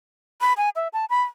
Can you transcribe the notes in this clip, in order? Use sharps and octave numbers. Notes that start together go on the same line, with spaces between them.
B5
G#5
E5
A5
B5